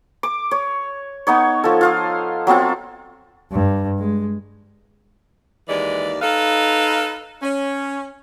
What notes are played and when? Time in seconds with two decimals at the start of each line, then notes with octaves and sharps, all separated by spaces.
0.23 D6
0.51 C#5
1.27 B3 D#4 C#5
1.64 F3 A4
1.81 F4 F5 D#6
2.47 F#3 B3 C4 F4
3.51 G2
3.99 G#3
5.67 D#2 E3 G#3 D5
6.22 D#4 A4 B4 F5
7.42 C#4